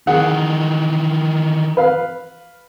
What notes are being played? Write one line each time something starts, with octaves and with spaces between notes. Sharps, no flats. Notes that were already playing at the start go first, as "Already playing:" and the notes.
D#3 E3 G#4 F#5
B4 F5